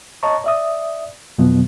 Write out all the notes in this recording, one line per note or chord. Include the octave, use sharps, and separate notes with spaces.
C#5 D#5 A5 A#5 C#6
D5 E5 D#6
F2 B2 D#3 F3 F#3 B3